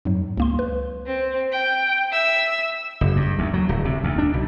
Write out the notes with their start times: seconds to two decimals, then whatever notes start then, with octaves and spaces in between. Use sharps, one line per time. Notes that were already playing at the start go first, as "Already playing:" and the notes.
0.05 F2 G#2 F#3
0.37 C#2 A#3 C6
0.59 B4
1.06 C4
1.52 G5
2.12 E5 E6
3.01 F#1
3.16 G2
3.39 D2
3.54 F#3
3.69 D1
3.85 C3
4.04 D2
4.18 D4
4.34 B1